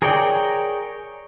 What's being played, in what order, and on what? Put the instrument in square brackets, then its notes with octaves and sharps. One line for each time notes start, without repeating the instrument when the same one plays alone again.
[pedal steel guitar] G#4 A#4 C#5 D5 G5